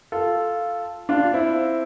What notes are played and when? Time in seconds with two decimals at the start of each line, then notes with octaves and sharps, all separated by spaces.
0.12 F4 A4
1.09 D4 F4
1.34 C4 E4